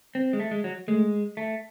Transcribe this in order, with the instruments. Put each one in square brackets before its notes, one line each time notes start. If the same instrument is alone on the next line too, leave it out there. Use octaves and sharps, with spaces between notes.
[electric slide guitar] C4
G#3
A3
G#3
F#3
[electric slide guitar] G#3 [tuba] A3
[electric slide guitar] A3